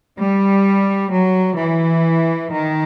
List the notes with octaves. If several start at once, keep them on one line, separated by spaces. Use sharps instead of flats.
G3
F#3
E3
D#3